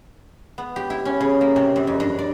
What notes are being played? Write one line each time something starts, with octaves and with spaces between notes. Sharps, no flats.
B3
G4
E4
C#4
C#3
A#3
C3
F#2
F2
G2
D5